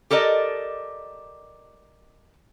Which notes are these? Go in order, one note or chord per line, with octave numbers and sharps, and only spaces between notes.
G4 A4 A#4 D5 D#5